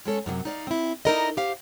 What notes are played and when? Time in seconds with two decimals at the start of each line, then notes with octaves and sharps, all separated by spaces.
0.05 G#3 C#4 A4 C#5
0.26 F#2 C3 F3 F#3
0.45 D#4 D5 F5
0.67 C4 E4
1.05 D#4 E4 A4 A#4 D5 D#5
1.37 G4 C5 F5